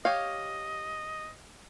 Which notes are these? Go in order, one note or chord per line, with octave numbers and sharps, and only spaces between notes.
G4 C#5 D#5 F5